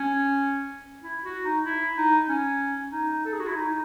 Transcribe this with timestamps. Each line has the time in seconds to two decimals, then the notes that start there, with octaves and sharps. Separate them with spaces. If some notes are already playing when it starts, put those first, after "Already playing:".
Already playing: C#4
1.03 E4
1.25 F#4
1.45 D#4
1.65 E4
1.98 D#4
2.29 C#4
2.92 D#4
3.25 A4
3.33 G#4
3.40 F#4
3.47 E4
3.55 D#4